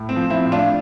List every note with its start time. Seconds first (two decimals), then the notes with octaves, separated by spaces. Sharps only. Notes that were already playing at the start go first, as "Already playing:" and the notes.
Already playing: A2
0.09 C4
0.16 F3
0.30 C4 E4
0.45 A2
0.52 D4 F4